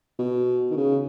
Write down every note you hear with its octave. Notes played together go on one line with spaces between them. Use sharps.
B2
D#3
C#3